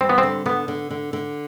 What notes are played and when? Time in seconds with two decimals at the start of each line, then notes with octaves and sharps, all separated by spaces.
0.01 G3 C4
0.09 B3
0.18 C4
0.23 D3
0.46 D3 B3
0.68 D3
0.91 D3
1.13 D3